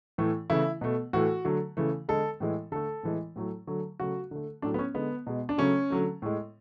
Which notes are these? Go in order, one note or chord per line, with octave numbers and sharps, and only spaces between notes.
A2 E3 A3
C#3 E3 A3 E4
B2 A3
A2 E3 A3 F#4
D3 F#3 A3
C#3 E3 A3
D3 G#3 A4
A2 E3 G#3
D3 A3 A4
A2 E3 G#3
A2 F#3 A3
D3 F#3 A3
C#3 F#3 A3 F#4
D3 A3
A2 F#3 A3 D4
B3
C#4
D3 G#3 B3
B2 G#3
D4
C#3 F#3 A3 C#4
D3 F#3 A3
A2 G#3